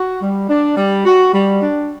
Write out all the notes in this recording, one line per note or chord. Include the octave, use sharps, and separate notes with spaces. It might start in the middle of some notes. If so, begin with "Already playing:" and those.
Already playing: F#4
G3
D4
G3
F#4
G3
D4